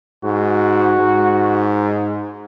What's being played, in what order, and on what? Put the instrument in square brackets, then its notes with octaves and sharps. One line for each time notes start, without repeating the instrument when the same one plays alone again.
[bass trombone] G#2 [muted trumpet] F#4
[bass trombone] G#2